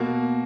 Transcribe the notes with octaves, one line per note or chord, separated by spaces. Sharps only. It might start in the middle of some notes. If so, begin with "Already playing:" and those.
Already playing: B2 A#3 F#4